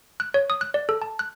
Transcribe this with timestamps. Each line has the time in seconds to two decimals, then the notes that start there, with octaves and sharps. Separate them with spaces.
0.20 F#6
0.34 C#5
0.50 D#6
0.61 F#6
0.74 D5
0.89 A4
1.02 A5
1.19 F#6